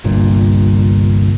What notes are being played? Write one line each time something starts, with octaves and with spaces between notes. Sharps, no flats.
G1 C2 G2 A#2